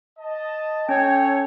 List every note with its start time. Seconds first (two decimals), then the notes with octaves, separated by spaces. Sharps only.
0.19 D#5 A5
0.89 C#4 A4 C#5 G5